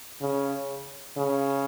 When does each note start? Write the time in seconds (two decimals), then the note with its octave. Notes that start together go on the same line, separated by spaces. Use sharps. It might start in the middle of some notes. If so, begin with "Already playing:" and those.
0.21 C#3
1.18 C#3